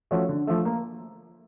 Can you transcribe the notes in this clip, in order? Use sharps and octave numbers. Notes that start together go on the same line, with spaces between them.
F3 A3 C#4 F#4
D3
F3 A3
A#3